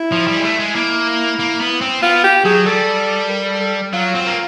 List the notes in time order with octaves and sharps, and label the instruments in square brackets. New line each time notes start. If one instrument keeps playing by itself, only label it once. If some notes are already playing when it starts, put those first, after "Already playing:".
Already playing: [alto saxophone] E4
[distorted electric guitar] F3
G3
G#3
A3
G#3
[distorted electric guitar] A#3 [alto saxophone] E4
[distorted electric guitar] A#3
B3
C4
[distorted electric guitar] B3 [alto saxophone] F4
[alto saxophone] G4
[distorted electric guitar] F#3 [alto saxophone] G#4
[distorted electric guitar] G3 [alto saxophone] A4
[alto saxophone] A4
A#4
A4
A4
[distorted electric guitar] F#3 [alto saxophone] F4
[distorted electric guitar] C4
A#3